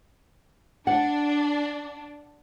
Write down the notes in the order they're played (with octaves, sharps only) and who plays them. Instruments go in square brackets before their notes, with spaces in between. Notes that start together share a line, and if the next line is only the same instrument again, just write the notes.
[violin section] D4 [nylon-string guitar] F#5